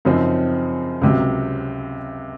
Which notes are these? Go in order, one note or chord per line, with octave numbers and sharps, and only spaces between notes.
F#2 C#3 F3 C4 D#4
C#2 C3 F#3